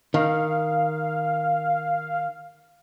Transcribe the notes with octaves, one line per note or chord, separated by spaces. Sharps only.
D#3 F5